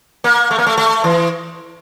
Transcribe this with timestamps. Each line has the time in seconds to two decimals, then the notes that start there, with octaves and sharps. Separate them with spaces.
0.24 A#3
0.51 A3
0.58 A#3
0.66 A3
0.78 A3
1.04 E3